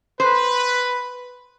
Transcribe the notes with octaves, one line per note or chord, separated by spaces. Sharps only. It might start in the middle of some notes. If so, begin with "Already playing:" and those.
B4 C5